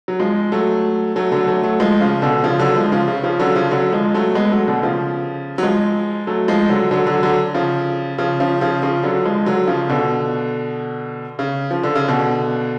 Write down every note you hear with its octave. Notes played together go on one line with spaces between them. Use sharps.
F#3
F3 G#3
F#3 A3
F#3 A3
D3 F#3
F#3 A3
F#3 A3
F3 G#3
C#3 F3
B2 D3
C#3 F3
D3 F#3
F3 G#3
C#3 F3
C#3
C#3 F3
D3 F#3
C#3 F3
D3 F#3
F3 G#3
F#3 A3
G#3 B3
F#3 A3
B2 D3
C#3 F3
F#3
F3 G#3
F#3 A3
F3 G#3
D3 F#3
D3 F#3
D3 F#3
D3 F#3
C#3 F3
C#3 F3
C#3 F3
C#3 F3
C#3 F3
D3 F#3
F3 G#3
D3 F#3
C#3 F3
B2 D3
C#3
F3
D3
C#3
B2 D3